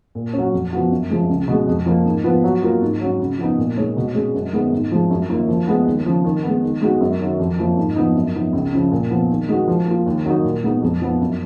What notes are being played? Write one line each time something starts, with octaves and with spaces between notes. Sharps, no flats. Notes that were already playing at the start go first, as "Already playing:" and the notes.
A#2
C#4
F#3
F2
F3 B3 F#4
F#2
F3 G#3
C#2
B2 G#3
F2
F3 A#3
G#2
F3 B3 F4 B4
F#3
A#3 F4 A#4
G#2
F#3 C#4
C#3
F3 B3 D#4
A#2
G#3 D#4 A#4 C#5
B2
G#3 C#4 G#4
F#2
D#3 G#3 B3
G#2
F3 G#3
F#2
D#3 A#3 F4 A#4
F3
G#3 B3
D#2
C#3 F3
D#3
B3
G#3
D#3
G#3 B3 D#4 F#4
F#2
D#3 F#3
F2
F3 A#3
G#2
F3 B3 D#4
F#2
F3 B3 D#4
C#2
C#3 F3
A#2
F3 B3
D#3
G#3 D#4 F#4 A#4
F3
A#3 F4
D#2
D#3 F#3 A#3 D#4
A#2
G#3 B3 D#4
F2
F3 B3 D#4
F#2